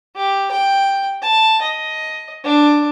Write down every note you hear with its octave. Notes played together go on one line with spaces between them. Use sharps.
G4
G5
A5
D#5
D4